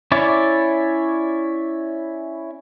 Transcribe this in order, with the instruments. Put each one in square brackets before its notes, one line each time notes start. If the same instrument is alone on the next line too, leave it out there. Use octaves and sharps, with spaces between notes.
[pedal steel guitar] C#4 E4 C#5 D5